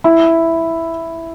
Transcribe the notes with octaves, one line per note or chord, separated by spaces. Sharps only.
E4